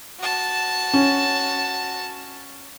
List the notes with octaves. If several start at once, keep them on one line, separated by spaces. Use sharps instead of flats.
F#4 A5
C#4